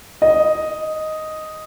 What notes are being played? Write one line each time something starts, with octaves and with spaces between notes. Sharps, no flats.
D#5